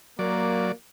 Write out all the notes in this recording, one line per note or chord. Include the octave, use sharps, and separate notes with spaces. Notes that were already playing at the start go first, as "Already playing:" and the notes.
F#3 A#3 D5